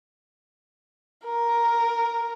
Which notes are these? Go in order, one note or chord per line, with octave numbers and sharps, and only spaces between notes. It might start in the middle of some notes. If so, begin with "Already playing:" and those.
A#4